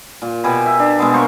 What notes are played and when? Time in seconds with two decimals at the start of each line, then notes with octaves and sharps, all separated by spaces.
0.22 A#2
0.44 B2 G4 G#5 B5
0.66 E5
0.79 D4
0.99 B2 G#3 B3
1.14 A#3 C5 C#6